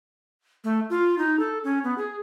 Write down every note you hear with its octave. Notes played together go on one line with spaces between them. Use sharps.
A3
F4
D#4
A4
C#4
B3
G#4